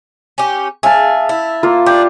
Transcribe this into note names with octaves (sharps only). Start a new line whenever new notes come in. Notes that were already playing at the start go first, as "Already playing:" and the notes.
C#4 G4
G#4 E5 F5 A5
E4
A#3 F4
D4 G4